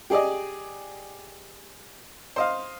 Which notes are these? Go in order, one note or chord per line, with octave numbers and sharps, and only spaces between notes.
G4 G#4 D5 D#5
C5 D#5 F5